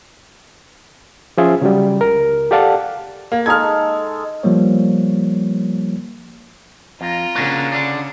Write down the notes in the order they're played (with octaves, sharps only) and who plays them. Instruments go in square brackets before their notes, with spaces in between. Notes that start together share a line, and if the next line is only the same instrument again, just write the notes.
[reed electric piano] F3 C#4 F4 G#4 E5
C#3 F#3 G3
C#2 A#4
G4 A4 D5 F5 F#5 A5
[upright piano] A#3
[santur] G#3 D#4 A4 [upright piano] F6 G#6
[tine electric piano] F3 G3 A#3 C#5
[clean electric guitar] F2 [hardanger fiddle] F4 A#5
[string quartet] C#3 [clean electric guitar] A#3 D4 F#4
[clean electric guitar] D3 D4